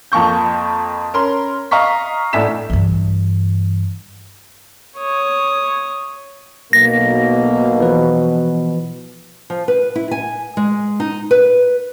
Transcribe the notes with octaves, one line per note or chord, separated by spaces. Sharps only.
F2 F3 A#3 C#6 G6
C#4 A#4 B5 C6
D#5 F5 A#5 C#6 B6
A1 A2 D4 E5 B6 E7
G2 E3
C#5 D#6
B1 B2 A#3 A#6
E3 F3 B4
F3
B4
E4
G#5
G#3
D#4
B4